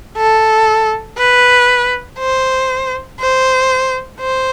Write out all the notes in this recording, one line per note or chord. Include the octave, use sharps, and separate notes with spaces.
A4
B4
C5
C5
C5